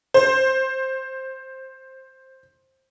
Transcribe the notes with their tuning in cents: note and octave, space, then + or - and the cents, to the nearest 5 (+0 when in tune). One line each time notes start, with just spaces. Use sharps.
C5 +15